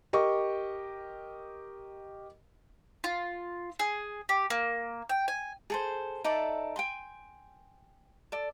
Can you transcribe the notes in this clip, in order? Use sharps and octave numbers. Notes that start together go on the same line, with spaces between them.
G4 A#4 D#5 C#6
F4
G#4
G4
A#3
G5
G#5
G#4 A4 C5
D#4 A4 D5 E5
G5 G#5 C6
A4 D5